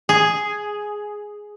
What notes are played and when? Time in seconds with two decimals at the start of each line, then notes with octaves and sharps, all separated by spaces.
0.09 G#4